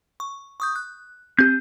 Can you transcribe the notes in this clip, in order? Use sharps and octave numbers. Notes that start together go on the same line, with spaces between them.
C#6
C#6 D#6 G6
F#6
C4 G4 G6